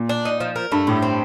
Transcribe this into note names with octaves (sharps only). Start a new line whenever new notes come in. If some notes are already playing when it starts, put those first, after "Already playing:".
Already playing: A#2
D4
D#4
F3
A#4
G2 A3
A2 G4
C4